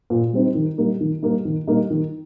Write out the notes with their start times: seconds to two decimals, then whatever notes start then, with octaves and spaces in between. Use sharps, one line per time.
0.10 A#2
0.33 G3 C4 D#4
0.55 D#3
0.78 G3 A#3 D#4
1.01 D#3
1.23 G3 A#3 D#4
1.45 D#3
1.68 G3 A#3 D#4
1.90 D#3